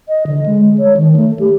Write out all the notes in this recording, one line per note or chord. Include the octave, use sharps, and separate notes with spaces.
D#5
D3
G#3
C#5
D#3
A3
G4